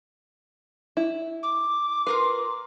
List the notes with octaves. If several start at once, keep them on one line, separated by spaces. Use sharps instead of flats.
E4
D6
F4 A#4 B4 C6